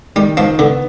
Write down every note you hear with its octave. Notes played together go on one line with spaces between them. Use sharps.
D#3 G3
D#3 F3
D3 B3